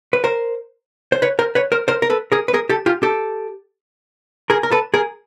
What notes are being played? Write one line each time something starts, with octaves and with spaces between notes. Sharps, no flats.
B4
A#4 C5
C5
B4 C#5
A#4 C5
B4 C#5
A#4 C5
A#4 C5
A#4
A4 B4
G#4 A#4
B4
G#4 A#4
G4 A4
F4 G4
G4 A4
G#4 A#4
A#4
A4 B4
G#4 A#4